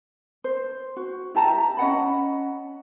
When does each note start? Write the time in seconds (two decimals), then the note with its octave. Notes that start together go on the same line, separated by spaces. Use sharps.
0.44 C5
0.97 F#4
1.35 E4 G4 A5 A#5
1.49 E5
1.77 C#4 D#5 F#5 B5